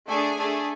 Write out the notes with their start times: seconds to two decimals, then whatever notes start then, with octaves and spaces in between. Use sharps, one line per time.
0.08 A3 D4 G#4 G#5
0.37 A3 D4 G#4